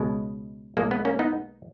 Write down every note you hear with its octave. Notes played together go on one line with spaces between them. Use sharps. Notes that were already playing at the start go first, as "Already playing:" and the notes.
Already playing: C#2 B2 G#3
B1 A#2 G#3 A#3
B3
A#3 C#4
B3 D#4